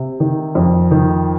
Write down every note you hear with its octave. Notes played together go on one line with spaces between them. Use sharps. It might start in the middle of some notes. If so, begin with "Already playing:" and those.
Already playing: C3
D#3
F2
D#3